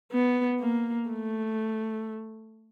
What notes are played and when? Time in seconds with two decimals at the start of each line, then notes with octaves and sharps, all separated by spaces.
0.12 B3
0.61 A#3
1.09 A3